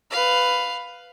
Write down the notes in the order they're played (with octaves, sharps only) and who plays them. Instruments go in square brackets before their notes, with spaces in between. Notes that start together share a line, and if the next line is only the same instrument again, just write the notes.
[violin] B4 F5